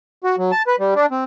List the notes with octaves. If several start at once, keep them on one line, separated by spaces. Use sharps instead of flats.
F#4
F#3
A5
B4
G3
D4
C4